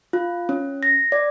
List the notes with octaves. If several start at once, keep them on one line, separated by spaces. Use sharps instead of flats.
F4
C#4
A#6
D5